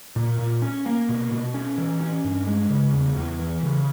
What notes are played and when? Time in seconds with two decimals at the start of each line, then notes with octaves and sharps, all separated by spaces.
0.16 A#2
0.39 A#2
0.62 C#4
0.86 A#3
1.09 B2
1.32 B2
1.54 C#4
1.78 E3
2.01 C#4
2.24 G2
2.47 G#3
2.70 C#3
2.93 E2
3.16 E2
3.39 E3
3.63 C#3